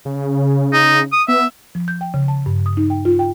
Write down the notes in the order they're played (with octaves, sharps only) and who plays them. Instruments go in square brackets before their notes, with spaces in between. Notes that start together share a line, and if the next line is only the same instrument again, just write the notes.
[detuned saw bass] C#3
[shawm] D#4
D#6
[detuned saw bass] B3 [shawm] E5
[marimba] F3
G6
G5
C#3
A5
G2
D#6
D#4
G5
F4
G5